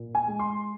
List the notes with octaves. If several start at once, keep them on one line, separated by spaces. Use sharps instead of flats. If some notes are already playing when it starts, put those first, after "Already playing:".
Already playing: A#2
G#5
G#3
C6